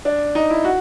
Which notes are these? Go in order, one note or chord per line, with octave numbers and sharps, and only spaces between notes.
D4
D#4
E4
F#4